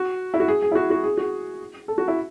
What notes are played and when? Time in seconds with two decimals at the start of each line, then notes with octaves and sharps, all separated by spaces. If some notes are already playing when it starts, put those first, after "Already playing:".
Already playing: F#4
0.34 E4
0.40 F#4
0.48 G#4
0.62 G#4
0.72 E4
0.75 F#4
0.90 F#4
1.03 G#4
1.17 F#4
1.88 A4
1.98 F#4
2.08 E4